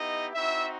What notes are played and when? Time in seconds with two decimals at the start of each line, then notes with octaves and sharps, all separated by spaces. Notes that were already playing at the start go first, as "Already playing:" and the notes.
Already playing: B3 D#4 E4 G4 D#5
0.34 C4 D#4 E4 F#4 E5